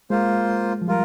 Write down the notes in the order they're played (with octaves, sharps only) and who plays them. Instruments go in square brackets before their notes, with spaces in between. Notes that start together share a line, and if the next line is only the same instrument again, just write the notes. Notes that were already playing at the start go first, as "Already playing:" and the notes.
[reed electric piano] G#3 [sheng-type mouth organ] A#3 F4 C5
[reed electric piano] F3
[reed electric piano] G3 [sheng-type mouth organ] F4 A#4